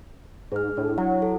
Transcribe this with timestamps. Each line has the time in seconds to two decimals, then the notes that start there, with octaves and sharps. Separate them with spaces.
0.52 G#2 G#4 F6
0.77 A2 D4
0.98 F#3 E4 F#5
1.22 A4